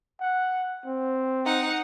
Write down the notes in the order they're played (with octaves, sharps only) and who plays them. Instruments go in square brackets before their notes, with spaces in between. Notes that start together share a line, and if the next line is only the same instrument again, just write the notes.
[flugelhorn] F#5
C4
[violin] D#4 F#5